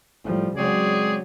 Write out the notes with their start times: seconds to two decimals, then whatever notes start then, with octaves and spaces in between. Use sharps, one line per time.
0.24 A2 F3 G3
0.57 C#3 F#3 G#3 C4 G#4 C#5 D5